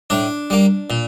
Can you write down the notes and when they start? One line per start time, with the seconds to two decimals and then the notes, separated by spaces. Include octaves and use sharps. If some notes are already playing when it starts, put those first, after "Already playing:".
0.10 A2 D4
0.50 G3 A#3
0.90 A#2